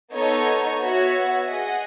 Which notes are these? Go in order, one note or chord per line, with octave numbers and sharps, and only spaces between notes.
B3 D#4 A4 C#5
B3 F#4 C#5 E5
G#4 D#5 F#5